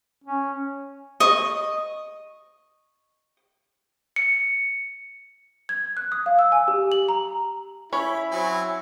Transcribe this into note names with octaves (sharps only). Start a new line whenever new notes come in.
C#4
D#5 C#6
C#7
G#6
F#6
D#6
F5
E6
G#5
G4
F#7
A#5
C#4 E4 C#5 B5
F#3 C4 G#5